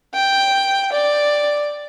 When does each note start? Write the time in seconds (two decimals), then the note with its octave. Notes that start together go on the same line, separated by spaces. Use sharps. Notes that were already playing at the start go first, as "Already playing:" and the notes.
0.14 G5
0.92 D5